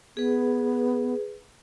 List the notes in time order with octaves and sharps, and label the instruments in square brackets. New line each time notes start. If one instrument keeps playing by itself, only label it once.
[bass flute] B3 [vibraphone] G#4 B4